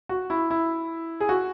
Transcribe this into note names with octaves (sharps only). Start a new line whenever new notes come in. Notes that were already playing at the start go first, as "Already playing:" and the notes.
F#4
E4
E4
G#4
F#4